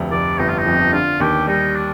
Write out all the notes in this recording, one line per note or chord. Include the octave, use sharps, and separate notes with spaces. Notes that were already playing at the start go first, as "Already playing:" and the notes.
Already playing: F1 D2
F1 D5
G1 D#4
F4
D#4
F2
D3 F4
D#2 G4
G3 D#4
D4